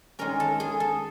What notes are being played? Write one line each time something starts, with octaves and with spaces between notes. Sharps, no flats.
D#3 G#3 C#4 A#4
A4
G#4
A4